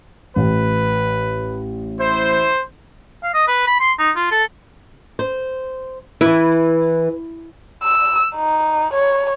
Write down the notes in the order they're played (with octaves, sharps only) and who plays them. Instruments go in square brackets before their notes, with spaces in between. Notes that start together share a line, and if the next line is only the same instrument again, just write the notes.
[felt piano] A1 [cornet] B4
[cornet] E4 [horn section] C5
[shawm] F5
D#5
B4
B5
C6
D#4
F4
A4
[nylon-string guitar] C5
[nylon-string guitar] E3 B4 [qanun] E4
[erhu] E6
D#4
C#5